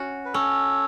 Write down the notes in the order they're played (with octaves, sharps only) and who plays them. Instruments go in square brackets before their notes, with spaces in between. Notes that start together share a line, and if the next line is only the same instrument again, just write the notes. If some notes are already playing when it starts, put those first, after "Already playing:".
Already playing: [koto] C#4 F#4
[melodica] B4
[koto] C#4 [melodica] A4 C#5